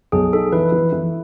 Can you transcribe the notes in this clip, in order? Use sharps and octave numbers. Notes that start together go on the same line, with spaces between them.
B1 G#4
D#4 A4
E3 B4
E3
E3